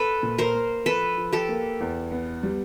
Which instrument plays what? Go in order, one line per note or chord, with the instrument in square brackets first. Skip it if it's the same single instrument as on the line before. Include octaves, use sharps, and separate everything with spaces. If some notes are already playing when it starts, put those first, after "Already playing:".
Already playing: [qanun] A4 B4
[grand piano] A#2
[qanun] A#4 C5
[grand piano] A#3
[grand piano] F3 [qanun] A4 B4
[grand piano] F3
[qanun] G4 A4
[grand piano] A#3
E2
B3
G3